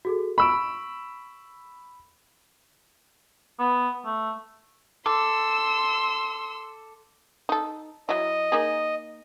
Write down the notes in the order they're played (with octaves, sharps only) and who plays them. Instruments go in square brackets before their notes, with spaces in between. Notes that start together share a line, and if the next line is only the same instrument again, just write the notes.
[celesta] F#4 G#4 A4
[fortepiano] B5 E6 [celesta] C#6 D7
[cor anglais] B3
A3
[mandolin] A4 [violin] C6 E6 [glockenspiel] D6
[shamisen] D#4 A4
[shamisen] F#3 E4 [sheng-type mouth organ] D#5
[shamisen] A#3 D#4 G#4